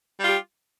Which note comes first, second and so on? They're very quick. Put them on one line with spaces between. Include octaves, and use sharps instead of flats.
G3 F4 G4